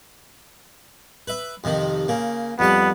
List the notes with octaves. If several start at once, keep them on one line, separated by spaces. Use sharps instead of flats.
B4 E5
F2 C3 D#3
C#3 A#3
F2 G3 B3 A5